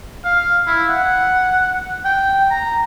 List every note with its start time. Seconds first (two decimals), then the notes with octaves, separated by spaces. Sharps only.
0.24 F5
0.67 E4
0.89 F#5
2.05 G5
2.51 A#5